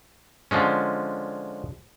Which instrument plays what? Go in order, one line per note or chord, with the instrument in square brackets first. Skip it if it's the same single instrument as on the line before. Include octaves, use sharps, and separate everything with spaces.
[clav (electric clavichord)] D3 F3 G#3 C#4